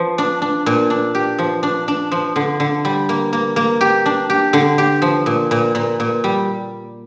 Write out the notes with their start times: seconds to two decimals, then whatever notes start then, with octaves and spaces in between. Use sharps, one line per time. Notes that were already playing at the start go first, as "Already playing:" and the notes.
Already playing: F3
0.18 D4
0.42 D4
0.66 A#2
0.90 D4
1.15 G4
1.39 F3
1.63 D4
1.88 D4
2.12 F3
2.36 D3
2.60 D3
2.85 G3
3.09 A#3
3.33 A#3
3.56 A#3
3.81 G4
4.06 D4
4.30 G4
4.53 D3
4.78 G4
5.02 F3
5.26 A#2
5.51 A#2
5.75 A#2
6.00 A#2
6.24 G3